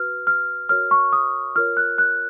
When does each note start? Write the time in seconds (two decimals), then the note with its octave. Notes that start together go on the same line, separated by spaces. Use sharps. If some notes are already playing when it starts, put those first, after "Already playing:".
Already playing: F#4 B4 F6
0.27 F6
0.69 F#4 A#4 C#5 F6
0.91 C#6
1.13 D#6
1.56 F4 A#4 C#5 F6
1.77 F#6
1.98 F#6